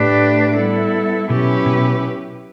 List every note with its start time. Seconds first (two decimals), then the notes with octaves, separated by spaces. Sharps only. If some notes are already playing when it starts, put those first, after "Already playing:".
Already playing: A2 A3 D4 G4 B4 D5
0.57 G3 B3 E4 A4
1.30 B2 F#3 C#4 E4 G4 B4
1.66 B2